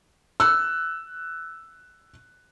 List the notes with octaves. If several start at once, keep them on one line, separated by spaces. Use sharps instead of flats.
E6 F#6